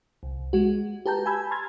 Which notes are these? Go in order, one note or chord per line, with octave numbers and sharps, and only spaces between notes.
C2
G#3 F#4
G4 B4 A5 A#5 G6
G#5 A5 B5 E6 G#6
A#5 C6 F6 G#6 A6